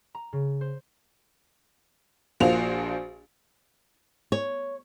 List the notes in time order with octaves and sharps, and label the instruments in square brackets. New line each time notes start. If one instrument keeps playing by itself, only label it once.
[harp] A#5
C#3
C5
[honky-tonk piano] A#1 F3 A#3 F#4 C5 F7
[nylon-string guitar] C#5